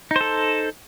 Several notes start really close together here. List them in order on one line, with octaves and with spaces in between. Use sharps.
D#4 C5 A4